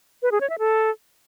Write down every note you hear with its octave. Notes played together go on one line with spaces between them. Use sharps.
B4
G#4
C#5
E5
A4